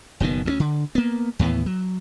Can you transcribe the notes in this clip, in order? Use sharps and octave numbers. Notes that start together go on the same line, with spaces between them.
F#1 B2 D#3 B3
D2 G#3 C#4
D3
A#3 B3
D#2 A2 E3 B3
F#3